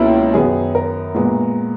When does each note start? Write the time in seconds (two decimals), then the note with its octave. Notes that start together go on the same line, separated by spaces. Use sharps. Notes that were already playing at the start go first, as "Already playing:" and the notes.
Already playing: C#2 B2 A#3 C#4 E4
0.34 F#2 D#3 F#3 B3 G#4
0.75 A#4
1.15 A#2 G#3 B3